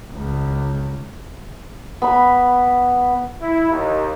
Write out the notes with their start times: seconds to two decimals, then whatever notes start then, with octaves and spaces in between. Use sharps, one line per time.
0.12 C#2
2.02 B3 B5
3.40 E4
3.69 D#2